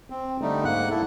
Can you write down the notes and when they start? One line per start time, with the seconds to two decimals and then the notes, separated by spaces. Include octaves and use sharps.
0.10 C4
0.42 D3 G3 A3 D#4
0.65 G#2 A#3 F#5 F#6
0.90 A#3 E4 A4